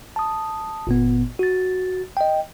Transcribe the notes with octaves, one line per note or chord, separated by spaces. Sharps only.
A5 D#6
G1 A#2 B3
F#4 A6
D#5 G5